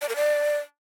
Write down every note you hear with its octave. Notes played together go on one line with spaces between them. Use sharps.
D5
A#4
D5